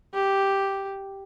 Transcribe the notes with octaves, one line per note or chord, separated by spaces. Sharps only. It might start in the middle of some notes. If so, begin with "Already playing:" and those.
G4